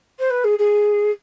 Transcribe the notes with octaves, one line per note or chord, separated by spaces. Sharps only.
C5
B4
G#4
G#4